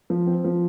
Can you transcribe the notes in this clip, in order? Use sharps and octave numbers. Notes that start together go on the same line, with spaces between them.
F3
C4
F3